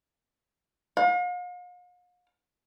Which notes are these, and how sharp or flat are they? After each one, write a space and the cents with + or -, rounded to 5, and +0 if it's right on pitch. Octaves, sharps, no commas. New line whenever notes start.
F5 +45